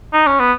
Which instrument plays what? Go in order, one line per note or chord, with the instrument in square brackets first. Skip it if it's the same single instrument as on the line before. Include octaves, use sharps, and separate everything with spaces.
[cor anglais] D#4
C#4
B3